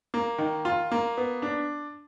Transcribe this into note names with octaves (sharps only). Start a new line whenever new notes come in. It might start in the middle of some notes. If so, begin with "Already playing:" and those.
A#3
D#3
F4
A#3
B3
D4